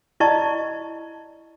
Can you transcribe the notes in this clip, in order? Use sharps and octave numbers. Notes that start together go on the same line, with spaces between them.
E4 D5 D#5 A5 C#6